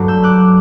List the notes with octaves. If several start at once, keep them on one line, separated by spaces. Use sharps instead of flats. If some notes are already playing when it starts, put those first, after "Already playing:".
Already playing: G2 F#3 A3 D4
E6 G6
D6 F#6